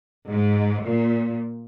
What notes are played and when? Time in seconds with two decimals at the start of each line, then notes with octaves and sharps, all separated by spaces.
0.28 G#2
0.84 A#2